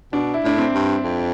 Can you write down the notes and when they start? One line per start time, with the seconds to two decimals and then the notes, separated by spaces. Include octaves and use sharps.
0.13 B2 D4
0.34 E4
0.44 A2 D4
0.58 C4
0.75 G2
1.04 F2